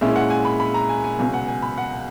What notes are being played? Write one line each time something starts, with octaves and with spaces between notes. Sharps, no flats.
A#2 G#3 C#4 E4 E5
F#5
G#5
B5
B5
A#5
G#5
G#5
C#2 B2 F#3 G#5
F#5
G#5
B5
F#5